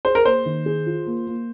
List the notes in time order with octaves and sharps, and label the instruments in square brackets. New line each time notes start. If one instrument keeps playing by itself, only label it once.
[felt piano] G#4 [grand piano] C5
[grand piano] A#4
[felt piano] A#3 [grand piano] C5
[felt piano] D#3
G#4
F4
A#3
A#3